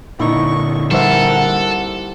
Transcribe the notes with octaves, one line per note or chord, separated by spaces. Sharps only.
A#2 D3 D#4 E4 C#6
G3 A4 A#4 C5 E5 F#5